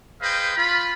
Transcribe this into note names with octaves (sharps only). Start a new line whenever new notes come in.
G#4 B4 C5 D#5 F5 G5
F4 B5